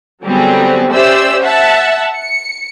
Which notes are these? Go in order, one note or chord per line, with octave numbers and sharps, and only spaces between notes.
D3 F#3 G3 B3 C4 G#4
C#4 G4 C5 D5 E5 E6
E5 F#5 A5
C#7